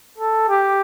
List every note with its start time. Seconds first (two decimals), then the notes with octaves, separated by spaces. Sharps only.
0.18 A4
0.49 G4